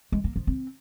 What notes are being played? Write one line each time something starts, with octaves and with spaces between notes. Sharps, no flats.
G#3
A#3
F3
C4